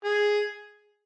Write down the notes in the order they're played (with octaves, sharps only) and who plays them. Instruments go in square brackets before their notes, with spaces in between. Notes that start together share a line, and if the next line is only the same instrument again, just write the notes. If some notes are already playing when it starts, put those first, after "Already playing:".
[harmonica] G#4